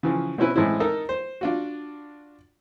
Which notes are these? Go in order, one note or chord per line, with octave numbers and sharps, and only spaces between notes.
C#3 E3 F3
B2 C4 C#4 E4 B4
A2 E3 G#3 C4 C#4 E4
D#4 A4 A#4 D#5
C5
D4 F4 F#4